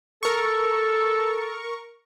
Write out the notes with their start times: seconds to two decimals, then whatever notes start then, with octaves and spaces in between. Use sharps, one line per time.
0.23 A4 A#4 C#6